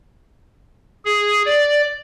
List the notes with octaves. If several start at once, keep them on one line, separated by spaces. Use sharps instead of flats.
G#4
D5